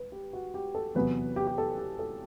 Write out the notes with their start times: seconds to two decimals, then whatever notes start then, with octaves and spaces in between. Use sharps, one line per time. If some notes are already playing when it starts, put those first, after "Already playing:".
Already playing: B4
0.12 G4
0.33 F#4
0.54 G4
0.75 A4
0.95 E2 C3 F#3 B3 B4
1.36 G4
1.47 G4
1.58 A4
1.78 G4
1.99 A4